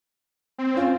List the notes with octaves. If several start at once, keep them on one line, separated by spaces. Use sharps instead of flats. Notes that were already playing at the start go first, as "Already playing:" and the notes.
C4
C#4 F4